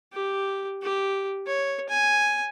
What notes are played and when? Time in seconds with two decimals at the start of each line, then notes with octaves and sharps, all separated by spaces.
0.13 G4
0.82 G4
1.47 C#5
1.89 G#5